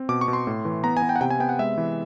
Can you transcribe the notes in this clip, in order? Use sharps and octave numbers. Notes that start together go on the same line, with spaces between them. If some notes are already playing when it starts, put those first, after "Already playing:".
Already playing: C4
B2 D6
C#6
B2
C6
A2
E3
B3 A#5
G#5
B3
G5
F#5
C3 G5
G#5
B3 G5
F#5
G#3 E5
E3